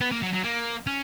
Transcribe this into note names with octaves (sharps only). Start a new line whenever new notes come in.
B3
A#3
F#3
F#3
A#3
C#4